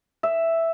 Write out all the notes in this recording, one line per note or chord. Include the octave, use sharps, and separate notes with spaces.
E5